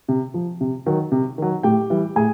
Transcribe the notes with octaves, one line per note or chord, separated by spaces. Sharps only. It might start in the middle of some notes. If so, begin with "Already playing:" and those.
C3
F3
C3
D#3 F#3
C3
D#3 F#3
A2 G4 G5
E3 G3
A2 G#4 G#5